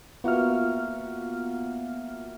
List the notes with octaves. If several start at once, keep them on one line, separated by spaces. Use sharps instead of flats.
A#3 B3 F4 F#4 E5 F6